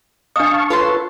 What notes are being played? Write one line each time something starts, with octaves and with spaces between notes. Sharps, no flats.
D4 F5 A5 C#6 D#6
F4 A4 B4 C#5 A5 C6